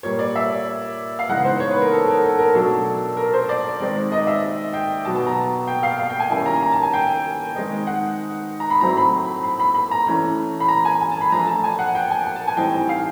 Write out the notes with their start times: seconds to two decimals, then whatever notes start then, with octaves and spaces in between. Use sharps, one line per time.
0.03 A#2 G3 A#3 C#5
0.19 D5
0.36 E5
1.19 F5
1.29 C#3 E3 G#3 B3 D#4 F#5
1.45 C5
1.60 C#5
1.71 B4
1.81 A#4
1.92 A4
2.08 A#4
2.24 A4
2.39 A#4
2.54 B2 F#3 A3 D4 A4
3.17 A#4
3.33 C5
3.49 D5
3.80 D#3 G#3 C4 D#4
4.12 D#5
4.27 E5
4.74 G5
5.05 B2 F#3 B3 A5
5.15 A5
5.27 A#5
5.67 G5
5.83 F5
5.99 F5
6.10 G5
6.20 G#5
6.30 D#3 G3 A#3 C#4 E4 G#5
6.46 A#5
6.62 A#5
6.72 A5
6.83 G#5
6.93 G5
7.56 D#3 G#3 C4 D#4
7.87 F#5
8.60 A#5
8.70 B5
8.81 A2 F#3 A3 C4 E4 A#5
8.97 B5
9.43 B5
9.60 B5
9.75 B5
9.91 A#5
10.07 E3 A3 C#4
10.60 B5
10.69 A#5
10.85 G#5
11.01 G#5
11.11 A5
11.21 B5
11.32 F3 A3 D4 A#5
11.47 A5
11.64 G#5
11.79 F#5
11.95 G5
12.11 G#5
12.26 G#5
12.36 A5
12.47 G#5
12.57 A2 E3 G3 C4 D#4 G5
12.89 F5